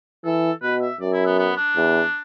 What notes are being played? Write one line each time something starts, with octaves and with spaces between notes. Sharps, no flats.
E3 A4
B2 B4
E5
F#2 D5
E4
B3
B3
D4
E2